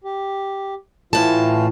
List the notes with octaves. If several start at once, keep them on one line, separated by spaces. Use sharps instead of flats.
G4
A2 E3 F4 A5